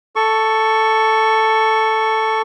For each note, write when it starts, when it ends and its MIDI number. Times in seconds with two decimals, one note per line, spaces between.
0.16 2.42 69
0.16 2.42 85